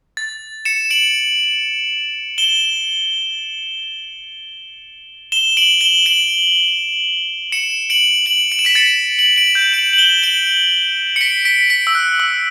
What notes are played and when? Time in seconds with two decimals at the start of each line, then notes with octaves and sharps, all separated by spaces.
0.17 A6
0.65 C#7 E7
0.91 D7 F#7
2.38 E7 G7
5.32 E7 G7
5.57 D7 F#7
5.81 E7 G7
6.06 D7 F#7
7.52 C#7 E7
7.90 D7 F#7
8.26 D7 F#7
8.52 D7
8.59 E7
8.65 B6 D7
8.75 A6 C#7
9.19 D7 F#7
9.36 D7 F#7
9.55 G6
9.73 D7 F#7
9.93 F#7
9.98 E7 G7
10.23 D7 F#7
11.16 C#7
11.21 B6 D7
11.45 B6 D7
11.70 B6 D7
11.87 E6
11.95 F#6
12.20 E6